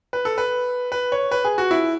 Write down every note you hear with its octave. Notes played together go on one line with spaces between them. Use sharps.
B4
A4
B4
B4
C#5
B4
G#4
F#4
E4